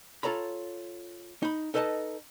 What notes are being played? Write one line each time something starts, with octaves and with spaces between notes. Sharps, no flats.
F4 A4 C#5 A#5 B5
D#4 B5
D#4 A4 B4 D#5 G#5 A5